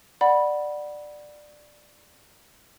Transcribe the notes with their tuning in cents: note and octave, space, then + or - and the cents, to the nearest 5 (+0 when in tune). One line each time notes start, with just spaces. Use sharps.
D5 +15 F#5 +0 B5 -15